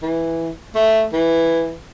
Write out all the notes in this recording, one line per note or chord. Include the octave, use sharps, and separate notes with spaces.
E3
A3
E3